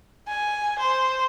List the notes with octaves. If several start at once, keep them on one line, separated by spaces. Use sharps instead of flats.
G#5
C5